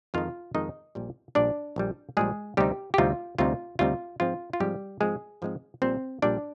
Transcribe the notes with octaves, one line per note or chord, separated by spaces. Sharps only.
F2 D#3 G#3 D#4 F4 F5
F2 D#3 G#3 D#4 D#5
A#1 A#2 G3
A#1 A#2 G3 D4 D5
A#1 A#2 G3
A#1 A#2 G3 G#3 G#4
D2 C3 G3 C4 D#4 G4
G4
D2 C3 G3 C4 D#4 F4
D2 C3 G3 C4 D#4 F4
D2 C3 G3 C4 D#4 F4
G#2 F3 G#3 C4 F4
F4
G#2 F3 G3 G#3 C4 G4
G#2 F3 G#3 C4 G#4
G#2 F3 G#3 C4
A#1 A#2 G3 C4 C5
A#1 A#2 G3 D4 D5